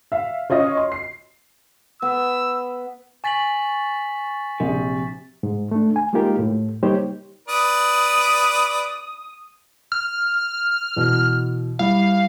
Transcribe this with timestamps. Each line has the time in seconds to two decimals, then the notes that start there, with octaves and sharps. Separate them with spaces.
0.12 E5 F5
0.50 C#4 F4 C#5 D#5
0.77 C6
0.92 C7
2.02 B3 E6
3.24 G#5 C#6 A6 B6 F#7
4.60 A#1 C3
5.43 G#2
5.71 A3 D4
5.96 G#5
6.13 G#3 A#3 D#4 F4 G4 A#4
6.39 A2
6.83 G3 A#3 D#4 G4 C5 C#5
7.48 B4 D5 D#6
9.92 F6
10.96 B2 E3
11.79 G3 E4 F5